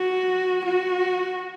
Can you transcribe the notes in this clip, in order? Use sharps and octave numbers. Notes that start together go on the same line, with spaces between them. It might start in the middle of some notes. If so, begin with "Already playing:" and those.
Already playing: F#4
F#4